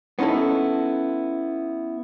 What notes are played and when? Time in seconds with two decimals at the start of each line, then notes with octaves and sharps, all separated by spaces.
0.19 B3 C#4 D#4 E4 A4